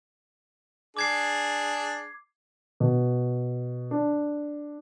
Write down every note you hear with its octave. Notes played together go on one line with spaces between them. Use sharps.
D4 G#4 D6 G#6 C7
B2
D4